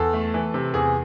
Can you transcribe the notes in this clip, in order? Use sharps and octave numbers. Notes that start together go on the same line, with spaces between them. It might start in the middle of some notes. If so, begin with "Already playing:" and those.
Already playing: E2 A4
A3
E3
C3
E2 G#4